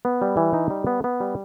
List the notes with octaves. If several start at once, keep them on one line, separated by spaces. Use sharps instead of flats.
B3
G3
E3
D#4
G3
B3
B3
G3